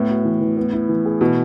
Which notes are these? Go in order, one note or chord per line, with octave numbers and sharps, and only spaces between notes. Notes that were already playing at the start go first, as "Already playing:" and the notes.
Already playing: A2 B3
F#4
E3
E3
B3
E4
E3
G#4
B2 E3